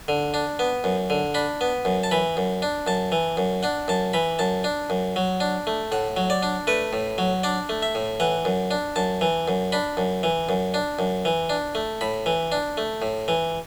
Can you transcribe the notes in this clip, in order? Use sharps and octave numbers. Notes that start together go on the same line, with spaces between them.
D3
D4
B3
F#2
D3
D4 B5
B3
F#2
A5
E3 B5
F#2
D4
F#2 A5
E3
F#2
D4 F#5
F#2 A5
E3 B5
F#2 A5
D4
F#2
F#3
D4
A3
A2 F#5
F#3
D5
D4
A3 B4
A2
F#3
D4 D5
A3
E5
A2
E3 F#5
F#2
D4
F#2 A5
E3
F#2
D4 B5
F#2
E3
F#2
D4
F#2
E3
D4
A3
A2 B5
E3
D4
A3
A2
E3